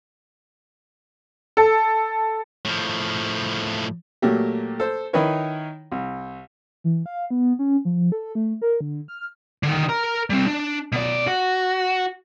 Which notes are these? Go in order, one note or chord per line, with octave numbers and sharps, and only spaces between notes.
A4
A2 F3
A#2 F#3 A3 A#3 G4
A4 C5
D#3 D#4 E4 A#4 B4 C#5
C2
E3
F5
B3
C#4
F3
A4
A3
A#4
D3
F6
D3 D#3
A#4 A#5
G3 C4
D4
B2 D5
F#4